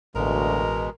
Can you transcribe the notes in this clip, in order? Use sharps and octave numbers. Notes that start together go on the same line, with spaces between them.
A1 D2 B2 G#3 A#4